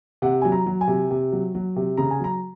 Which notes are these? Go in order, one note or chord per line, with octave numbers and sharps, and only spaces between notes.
C3 F#5
F#3 G#5
A#5
F#3
G#5
C3
C3
F#3
F#3
C3
C#3 A#5
G#5
F#3 A#5